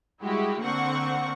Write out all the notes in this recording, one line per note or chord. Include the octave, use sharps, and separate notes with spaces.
G3 G#3 E4 F#4 G4
D3 A#3 C4 F#5 C#6